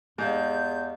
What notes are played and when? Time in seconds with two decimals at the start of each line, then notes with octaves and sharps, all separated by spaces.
0.18 E2 G#2 G4 D#5 F5 G6